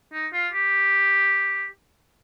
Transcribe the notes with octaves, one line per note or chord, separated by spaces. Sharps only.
D#4
F4
G4